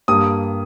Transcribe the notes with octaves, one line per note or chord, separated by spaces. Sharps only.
G2 G3 A#3 D#6